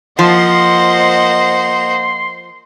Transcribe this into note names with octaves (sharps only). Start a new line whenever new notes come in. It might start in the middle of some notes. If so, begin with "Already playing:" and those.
F3 A#3 C5 D#5 F#5 C6